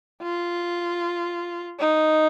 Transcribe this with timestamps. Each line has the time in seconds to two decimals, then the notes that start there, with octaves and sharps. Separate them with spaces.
0.22 F4
1.80 D#4